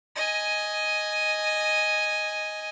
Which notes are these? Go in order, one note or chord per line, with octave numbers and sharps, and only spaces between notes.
D#5 G#5